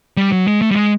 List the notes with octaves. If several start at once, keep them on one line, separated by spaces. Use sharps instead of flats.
G3
F#3
G#3
A3
G3
G#3